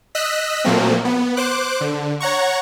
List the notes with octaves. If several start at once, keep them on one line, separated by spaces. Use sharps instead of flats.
D#5 E6 F#6 B6
A#2 F3 F#3 A3 A#3 C4
B3
C5 D6 F#6
D3
C#5 F#5 A#5 C#6